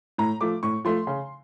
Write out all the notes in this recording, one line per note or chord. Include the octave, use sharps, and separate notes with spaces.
A2 A#5
F3 A3 D6
A2 C#6
F3 A3 C6
C#3